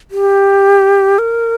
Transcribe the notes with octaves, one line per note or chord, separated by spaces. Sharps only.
G4
A#4